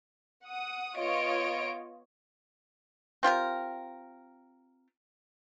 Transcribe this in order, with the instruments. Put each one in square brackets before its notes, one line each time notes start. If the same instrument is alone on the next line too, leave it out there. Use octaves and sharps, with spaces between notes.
[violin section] F#5 D#6
B3 F4 C#5 D#5 D7
[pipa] C4 F4 G4 A#4